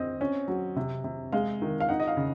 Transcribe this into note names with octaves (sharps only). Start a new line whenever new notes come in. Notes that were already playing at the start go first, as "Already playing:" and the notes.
Already playing: C4 D#5
C#4
F#3
C3
C3
G#3 F5
D#3
F5
D#4 F#5
D#5
F5
C#3